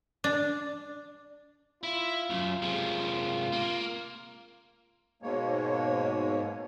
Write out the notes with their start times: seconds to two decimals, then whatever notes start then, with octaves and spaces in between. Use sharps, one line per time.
0.24 D4
1.83 E4 F4
2.30 C2 F#2
2.62 C3 G#3
3.53 A#3
5.22 G#2 B2 G#3 A#3 C#5